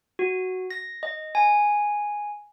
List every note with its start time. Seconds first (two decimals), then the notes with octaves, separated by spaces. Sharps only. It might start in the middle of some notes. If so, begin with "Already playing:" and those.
0.19 F#4
0.71 A#6
1.03 D#5
1.35 G#5